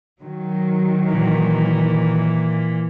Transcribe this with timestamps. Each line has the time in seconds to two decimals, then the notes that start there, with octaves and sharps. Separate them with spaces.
0.22 D#3 F#3
1.09 A#2 E3